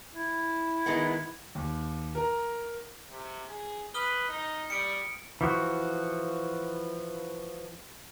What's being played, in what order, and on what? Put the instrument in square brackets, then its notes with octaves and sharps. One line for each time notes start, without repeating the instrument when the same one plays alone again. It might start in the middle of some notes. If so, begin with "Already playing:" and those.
[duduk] E4
[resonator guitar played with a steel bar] D#3 G#3 B3
[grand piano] D#2
A#4 A#5
[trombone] C3
G#4
[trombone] B4 [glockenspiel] D#6 F6 G7
[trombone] D#4
[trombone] G3 [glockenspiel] C#7 D7
[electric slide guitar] E3 F3 F#4